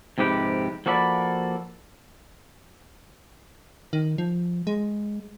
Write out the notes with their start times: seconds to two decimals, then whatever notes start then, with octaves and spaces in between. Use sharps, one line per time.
0.18 F2 G#2 C3 G4 B4
0.86 F3 A#3 F#4 A4 D5 B5
3.93 D#3
4.18 F3
4.67 G#3